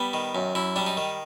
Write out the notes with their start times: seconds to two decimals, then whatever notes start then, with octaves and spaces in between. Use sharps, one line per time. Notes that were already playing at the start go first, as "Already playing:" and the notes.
Already playing: G3 B3
0.13 D#3
0.35 F#2
0.55 F#2 E4
0.76 G3 D4
0.86 D#4
0.97 D#3